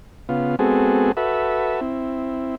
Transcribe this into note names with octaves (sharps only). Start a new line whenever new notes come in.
C#3 B3 F4
G#3 B3 C4 F#4 G#4 A4
F#4 A4 B4 E5
C4 E4